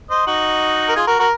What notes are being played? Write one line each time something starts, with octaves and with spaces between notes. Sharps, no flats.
C5 D#5
D#4 F#4
A#4
F4 G#4
F#4 A#4
F#4 A#4